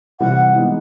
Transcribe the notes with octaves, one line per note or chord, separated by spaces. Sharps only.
C3 E3 G3 F#5
E3 G#3 B3 D#4